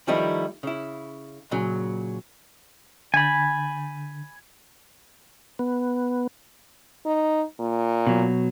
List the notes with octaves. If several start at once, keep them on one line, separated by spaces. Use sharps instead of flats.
D#3 F3 G3 A3 D#4 E4
C#3 E4
A#2 C#3 F#3
D3 G#5 B5 G6 A6
B3
D#4
A#2
B2 F#3